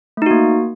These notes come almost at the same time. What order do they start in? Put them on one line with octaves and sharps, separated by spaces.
A3 D#4 F#4 A#3